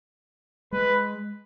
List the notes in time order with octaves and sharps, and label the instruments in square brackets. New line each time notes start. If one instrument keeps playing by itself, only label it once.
[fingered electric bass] G#3 [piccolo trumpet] B4